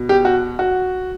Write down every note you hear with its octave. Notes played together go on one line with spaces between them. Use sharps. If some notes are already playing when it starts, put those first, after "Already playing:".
Already playing: B2
G4
F#4
F#4